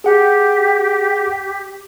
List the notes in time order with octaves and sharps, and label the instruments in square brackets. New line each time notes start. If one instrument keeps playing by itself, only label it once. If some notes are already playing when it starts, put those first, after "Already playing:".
[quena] G4 [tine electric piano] G#4 F#5